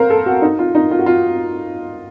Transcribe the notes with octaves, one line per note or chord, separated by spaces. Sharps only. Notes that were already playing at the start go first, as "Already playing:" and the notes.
Already playing: A#4 C5 F5
A4
F#4
D#4
F4
D#4
F4
F#4
F4